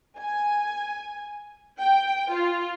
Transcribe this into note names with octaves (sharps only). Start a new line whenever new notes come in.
G#5
G5
F4